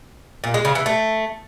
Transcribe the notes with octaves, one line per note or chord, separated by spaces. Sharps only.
A#2
G#3
C#3
E3
A3